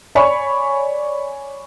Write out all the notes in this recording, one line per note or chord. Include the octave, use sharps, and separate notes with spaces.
C#5 D5 G#5 B5 C#6